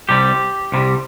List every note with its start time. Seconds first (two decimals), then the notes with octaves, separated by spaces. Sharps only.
0.09 C2 C3 G3 G4
0.72 C2 C3 G3